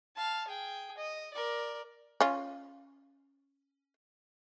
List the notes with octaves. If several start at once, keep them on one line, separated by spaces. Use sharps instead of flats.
F5 A5
G#4 G5
D#5
A#4 D5
C#4 F4